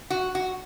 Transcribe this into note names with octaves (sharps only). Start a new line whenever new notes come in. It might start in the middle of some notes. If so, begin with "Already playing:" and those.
F#4
F#4